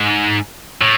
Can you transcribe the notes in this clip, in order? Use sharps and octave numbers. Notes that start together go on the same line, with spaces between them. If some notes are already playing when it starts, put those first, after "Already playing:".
Already playing: G#2
A2